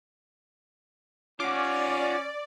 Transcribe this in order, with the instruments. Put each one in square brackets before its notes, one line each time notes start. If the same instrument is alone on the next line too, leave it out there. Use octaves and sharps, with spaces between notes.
[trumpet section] C#4 [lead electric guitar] F4 F#5 [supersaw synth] D5 [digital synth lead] D6